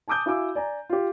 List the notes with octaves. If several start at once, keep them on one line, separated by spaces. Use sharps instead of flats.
G#5 A5 D6 D#6 G6
E4 F#4 F5 G#5 D6 E6
D5 G#5 A#5
F4 G4